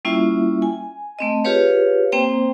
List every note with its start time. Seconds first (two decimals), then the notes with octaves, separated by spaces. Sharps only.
0.05 G3 A#3 C#4 E4 F4 E5
0.62 G#5
1.19 A3 C4 D#5
1.44 F4 G4 G#4 B4 C#5 F5
2.12 A#3 C4 C5 G5 A#5